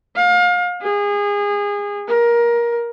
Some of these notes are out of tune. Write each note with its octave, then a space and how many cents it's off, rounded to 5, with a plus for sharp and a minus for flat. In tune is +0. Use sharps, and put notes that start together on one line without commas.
F5 +30
G#4 -25
A#4 +20